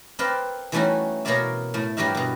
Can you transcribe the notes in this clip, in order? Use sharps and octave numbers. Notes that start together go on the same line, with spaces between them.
C4 A#4 B4 D5 F5 G5
E3 G3 A3 C#4 D#4 F#4
B2 A#3 A#4 C#5 D5 E5
A2 A3
G2 G3 F#4 G4 A#4 E5
B2 D3